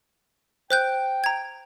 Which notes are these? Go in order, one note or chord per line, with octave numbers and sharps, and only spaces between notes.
C5 G5 F#6 G6
A#5 G#6